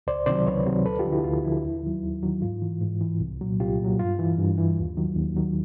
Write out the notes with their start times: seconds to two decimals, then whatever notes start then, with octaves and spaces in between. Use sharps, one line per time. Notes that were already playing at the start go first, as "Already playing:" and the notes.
0.07 C#2 C5 D5
0.26 C3 D#3 F#3 C5 D5
0.47 C#2 B4 C#5
0.66 C3 D#3 F#3
0.86 D2 A4 B4
0.99 F4 G4
1.05 D3 F3
1.12 E4 F#4
1.24 D2 F4
1.44 D3 F3 E4
1.65 D#2
1.83 D#3 F#3
2.03 D#2
2.23 D#3 F#3
2.42 G#2 F4
2.62 E3
2.81 G#2
3.01 E3
3.20 C2
3.41 A#2 F#3
3.60 C2 F4 G4
3.80 A#2 F#3
3.99 G2 F4
4.19 E3
4.38 G2
4.58 E3
4.77 D#2
4.97 D#3 F#3
5.16 D#2
5.37 D#3 F#3